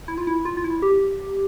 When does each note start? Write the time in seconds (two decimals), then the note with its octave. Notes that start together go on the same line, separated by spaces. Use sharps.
0.08 E4
0.18 F4
0.27 E4
0.45 F4
0.57 F4
0.64 E4
0.82 G4